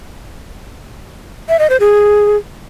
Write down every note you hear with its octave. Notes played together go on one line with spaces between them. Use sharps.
E5
D#5
C5
G#4